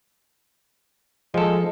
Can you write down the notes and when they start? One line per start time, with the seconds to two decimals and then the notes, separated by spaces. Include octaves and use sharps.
1.34 F3 G#3 A4